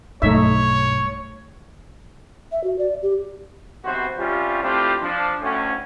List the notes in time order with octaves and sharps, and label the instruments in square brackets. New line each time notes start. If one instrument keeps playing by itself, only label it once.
[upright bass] B1 G2 [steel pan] A3 D#4 E5 [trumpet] C#5
[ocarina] E5
F#4
D5
G4
[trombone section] B1 C3 B3 F#4 C5
C3 G3 C#4 F4
A3 C4 D4 E4 F4 G4
F3 D4
D2 A2 C#4